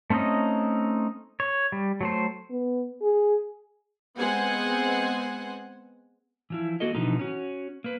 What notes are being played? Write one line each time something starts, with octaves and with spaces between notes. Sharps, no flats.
A3 C4 C#4 D#4 D#5
C#5
G3
F#3 A3 C5
B3
G#4
G#3 B3 C4 C5 F#5 G#5
E3 F3 E4
A#3 F#4 A4 D#5
B2 D3 E3 F3 D#4
C#4 F#4
A#3 B4